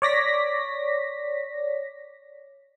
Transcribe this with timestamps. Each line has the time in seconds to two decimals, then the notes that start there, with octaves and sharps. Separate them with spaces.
0.02 C#5 D5 A#6 B6